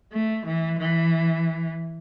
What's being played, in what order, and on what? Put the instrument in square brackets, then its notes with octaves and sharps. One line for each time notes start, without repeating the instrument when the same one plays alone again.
[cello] A3
E3
E3